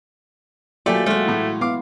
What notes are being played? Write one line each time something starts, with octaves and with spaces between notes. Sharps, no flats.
F#3 A3 A#3 F4 G4 D5 G#5
G#3 A3 F4 F#4
A2 E3
B3 E4 F5 D6